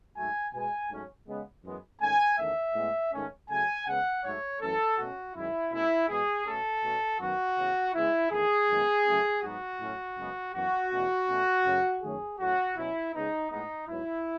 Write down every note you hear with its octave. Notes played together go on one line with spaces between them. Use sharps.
G#2 F#3 A3 G#5
B2 G#3 B3 G#5
G#2 F#3 A3 C#4
C#3 G#3 B3
F#2 E3 G#3 B3
G#2 D#3 A3 C#4 G#5
E2 D#3 A3 C#4 E5
A2 G#3 B3
G#2 D#3 A3 C#4
C#3 F#3 A3 G#5
C#3 G#3 B3 F#5
G#2 F#3 A3 C#5
F#2 E3 A3 C#4 A4
B2 A3 C#4 F#4
F#2 D#3 G#3 C#4 E4
B2 A3 C#4 E4
E2 B2 G#3 B3 G#4
B2 A3 C#4 A4
B2 A3 C#4
F#2 D#3 F#3 B3 F#4
C#3 E3 B3
C#3 G#3 B3 E4
E2 D#3 A3 G#4
F#2 D#3 G#3 B3
C#3 F#3 A3 C#4
G#2 F#3 B3 F#4
A2 F#3 A3 C#4
F#2 C#3 G#3 B3
F#2 E3 B3 F#4
E2 B2 A3 C#4
B2 A3 C#4
F#2 C#3 F#3 A3
F#2 D#3 F#3 A3 C#4 G#4
A2 F#3 A3 C#4 F#4
B2 F#3 C#4 E4
C#3 G#3 B3 D#4
A2 G#3 B3 D#4
G#2 F#3 B3 E4